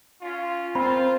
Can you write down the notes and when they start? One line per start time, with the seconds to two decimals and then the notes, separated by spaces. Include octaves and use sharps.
0.22 C#4 F4
0.75 C4 F4 A#4 C5 B5